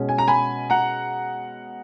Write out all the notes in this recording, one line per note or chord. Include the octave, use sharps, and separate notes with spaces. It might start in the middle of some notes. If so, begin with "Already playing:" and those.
Already playing: B2 G#3 C#4
G#5
A#5
G#5 B5
F#5 A#5